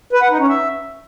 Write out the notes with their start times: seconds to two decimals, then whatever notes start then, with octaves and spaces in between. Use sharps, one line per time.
0.13 B4
0.22 F#5
0.31 D#4
0.40 C#4
0.48 E5